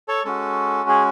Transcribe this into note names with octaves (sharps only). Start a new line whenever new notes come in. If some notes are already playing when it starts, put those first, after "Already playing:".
A4 C#5
G#3 C#4 F#4 A4
G#4